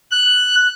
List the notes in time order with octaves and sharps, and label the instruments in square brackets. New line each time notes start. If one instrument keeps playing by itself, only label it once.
[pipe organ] F#6